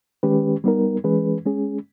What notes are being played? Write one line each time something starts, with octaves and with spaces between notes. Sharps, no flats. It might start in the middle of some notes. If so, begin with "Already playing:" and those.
D#3 G#3 C#4 G4 B4
G3 B3 D#4 A#4
E3 G#3 C#4 G#4 B4
G#3 C#4 G#4